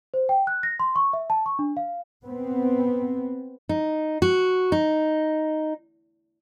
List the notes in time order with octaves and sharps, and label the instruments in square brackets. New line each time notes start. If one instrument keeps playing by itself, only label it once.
[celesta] C5
G5
F#6
A#6
C6
C#6
E5
A5
C#6
D4
F5
[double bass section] B3 C4
[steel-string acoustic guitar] D#4
F#4
D#4